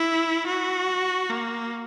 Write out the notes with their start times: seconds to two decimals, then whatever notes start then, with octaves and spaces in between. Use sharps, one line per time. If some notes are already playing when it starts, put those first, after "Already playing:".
Already playing: E4
0.47 F#4
1.30 A#3